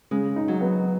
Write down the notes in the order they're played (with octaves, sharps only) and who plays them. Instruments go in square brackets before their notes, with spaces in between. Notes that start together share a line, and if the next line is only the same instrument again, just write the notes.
[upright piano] C#3 [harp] G#3
[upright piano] D#4
[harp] F#3
[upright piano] B3